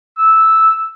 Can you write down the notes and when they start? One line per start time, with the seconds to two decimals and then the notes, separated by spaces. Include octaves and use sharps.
0.18 E6